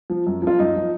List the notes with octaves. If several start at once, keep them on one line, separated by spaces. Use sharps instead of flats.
F3
F#2
F3 F4
F#2 D#4
F3